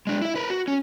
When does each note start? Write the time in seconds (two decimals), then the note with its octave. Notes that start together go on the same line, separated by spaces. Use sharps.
0.07 G#3 D4
0.21 E4 E5
0.36 A#4 B4
0.50 F#4
0.68 C#4